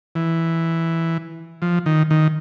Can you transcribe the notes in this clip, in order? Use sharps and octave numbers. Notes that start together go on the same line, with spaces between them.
E3
F3
D#3
D#3